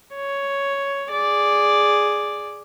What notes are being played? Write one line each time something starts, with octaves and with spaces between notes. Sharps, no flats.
C#5
G#4 D5